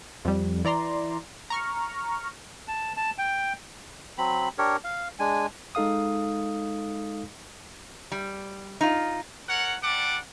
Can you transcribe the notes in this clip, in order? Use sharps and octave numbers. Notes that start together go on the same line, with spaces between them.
F2 G3
E3 D5 A#5 C6
A#5 C#6 F6
A5
A5
G5
F#3 C4 B5
D4 G4 A#4 C#5
F5
G#3 D4 G#5
G#3 D#4 A4 F5 D#6
G3
D#4 F4
A#4 C#5 F#5
G3 D4 F#5 D6